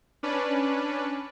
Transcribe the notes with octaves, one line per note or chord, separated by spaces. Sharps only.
C#4 D4 B4 D5